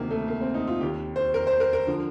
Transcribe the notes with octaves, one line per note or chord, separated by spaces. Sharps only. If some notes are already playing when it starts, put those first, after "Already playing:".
Already playing: D2 C3 D#3 A#3
A3
A#3
C4
D#4
F4
D#2 D#3 G4
C5
A#4
C5
A#4
A#4
D3 F3